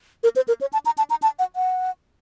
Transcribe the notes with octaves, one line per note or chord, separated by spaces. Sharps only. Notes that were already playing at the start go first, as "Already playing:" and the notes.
A#4
C5
A#4
C#5
A5
A#5
A5
A#5
A5
F#5
F#5